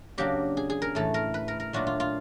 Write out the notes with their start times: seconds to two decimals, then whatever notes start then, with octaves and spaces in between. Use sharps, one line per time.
0.18 C#3 F#3 A#3 D4 G4
0.57 G#4
0.70 G#4
0.82 A#4
0.95 A2 E3 A3 A4
1.14 A#4
1.34 B4
1.48 A#4
1.60 A#4
1.73 A#2 F#3 A3 D4 F4 F#4
1.87 F4
2.00 F4